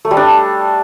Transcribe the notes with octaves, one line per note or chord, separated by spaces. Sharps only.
A3
G3
D4